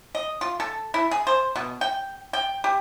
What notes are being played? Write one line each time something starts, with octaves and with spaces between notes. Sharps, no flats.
D#5
F4
A4
E4
G#4
C5
B2
G5
G5
G4